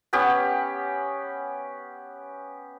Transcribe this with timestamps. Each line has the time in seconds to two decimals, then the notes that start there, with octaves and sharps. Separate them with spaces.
0.13 B3 C#4 G4